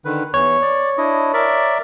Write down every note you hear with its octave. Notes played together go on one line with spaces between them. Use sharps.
D3 D#3 B4
E2 E3 C#5
D5
D4 E4 D#5
A#4 D5 E5